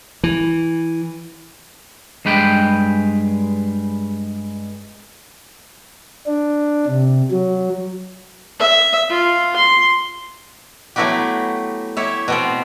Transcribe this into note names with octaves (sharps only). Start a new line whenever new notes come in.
E3
G2 G#3 B4 G5
D4
C3
F#3
E5
F4
C6
F#3 A3 B3 E4 F#4 G4
E4 G4 C#5 E5
B2 B3 C4